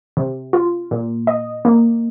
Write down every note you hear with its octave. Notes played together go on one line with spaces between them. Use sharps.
C3
F4
A#2
D#5
A#3